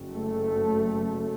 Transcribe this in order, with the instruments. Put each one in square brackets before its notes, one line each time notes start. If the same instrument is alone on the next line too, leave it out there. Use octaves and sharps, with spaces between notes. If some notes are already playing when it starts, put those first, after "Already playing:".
Already playing: [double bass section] F#1 F#2
A3